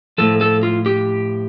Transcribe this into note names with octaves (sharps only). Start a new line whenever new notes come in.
A2 F3 A4
A4
F4
G4